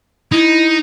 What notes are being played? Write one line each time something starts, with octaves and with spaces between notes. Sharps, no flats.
D#4 E4